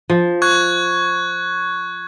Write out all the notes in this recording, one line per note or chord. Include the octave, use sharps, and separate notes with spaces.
F3
C#6 F#6 G#6